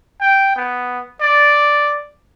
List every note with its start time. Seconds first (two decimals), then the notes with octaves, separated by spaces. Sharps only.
0.21 G5
0.56 B3
1.20 D5